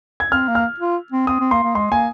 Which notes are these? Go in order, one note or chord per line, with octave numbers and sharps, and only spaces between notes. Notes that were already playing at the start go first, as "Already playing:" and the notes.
G#6
C4 F6
A#3
F6
F4
C4
C4 D#6
C4
A#3 C6
A#3
G#3 C6
A#3 G#5